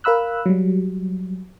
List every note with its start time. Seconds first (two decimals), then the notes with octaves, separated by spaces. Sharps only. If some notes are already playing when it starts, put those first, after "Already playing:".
0.04 A#4 F5 B5 E6 F#6
0.46 F#3 G3